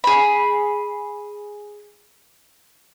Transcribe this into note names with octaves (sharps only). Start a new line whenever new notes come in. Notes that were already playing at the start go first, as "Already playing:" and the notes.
G#4 B5